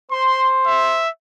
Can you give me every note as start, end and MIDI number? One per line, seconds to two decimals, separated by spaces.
0.11 1.04 72
0.11 0.49 84
0.67 1.09 76